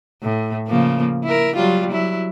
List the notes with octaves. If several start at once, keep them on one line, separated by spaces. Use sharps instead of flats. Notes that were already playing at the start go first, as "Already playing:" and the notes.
A2
C#3 F3 A#3
E4 A#4
F#3 G3 F4
F#3 E4